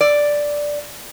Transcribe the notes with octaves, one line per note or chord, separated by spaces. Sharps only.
D5